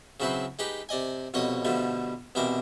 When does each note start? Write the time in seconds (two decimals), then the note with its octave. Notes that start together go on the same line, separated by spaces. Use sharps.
0.20 C#3 F#3 C4 E4 B4 C5
0.59 G#3 D#4 G4 B4
0.89 C3 D5 D#5 G#5
1.34 C2 F2 B2 C#5 D#5
1.65 B2 D3 F3 G3 A3
2.35 C2 B2 E3 C4 A#4 D6